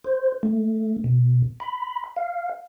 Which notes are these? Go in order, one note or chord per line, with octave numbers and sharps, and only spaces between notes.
C5
A3
B2
B5
F5